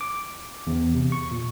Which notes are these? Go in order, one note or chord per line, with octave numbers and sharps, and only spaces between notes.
D6
E2
C3
C#6
A#2